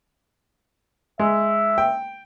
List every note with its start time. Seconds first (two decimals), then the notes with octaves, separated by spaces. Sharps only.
1.19 G#3 E5
1.78 G5